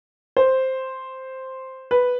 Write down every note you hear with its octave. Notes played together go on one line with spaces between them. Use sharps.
C5
B4